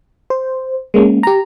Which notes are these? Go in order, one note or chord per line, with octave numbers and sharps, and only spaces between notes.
C5
G#3 A#3 C#4
G4 A#5